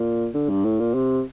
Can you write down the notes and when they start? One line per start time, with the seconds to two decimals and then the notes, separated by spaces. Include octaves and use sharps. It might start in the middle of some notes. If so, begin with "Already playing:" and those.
Already playing: A#2
0.34 D3
0.49 G2
0.65 A2
0.80 A#2
0.94 C3